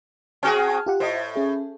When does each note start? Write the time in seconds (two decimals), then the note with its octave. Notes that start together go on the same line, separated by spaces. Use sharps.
0.43 C4 F#4 G#4 A5 F6
0.86 F4 G4 F#5
1.00 A2 C5 D#5
1.36 C#4 G#4